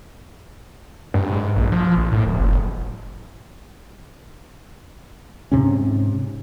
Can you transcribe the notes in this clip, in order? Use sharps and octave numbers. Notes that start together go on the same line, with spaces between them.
G2
G#2
A#1
F3
A#1
A2
D1
F#1
G#2 C3 C#4